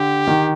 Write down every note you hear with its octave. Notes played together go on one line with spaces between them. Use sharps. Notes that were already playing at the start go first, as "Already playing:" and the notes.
Already playing: D3 G4
D#3